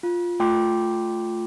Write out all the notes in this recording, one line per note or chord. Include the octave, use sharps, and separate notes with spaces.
F4
A3 F4 G5 C6 D6